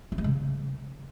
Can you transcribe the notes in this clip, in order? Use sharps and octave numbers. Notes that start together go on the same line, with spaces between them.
C4
G#3
C#3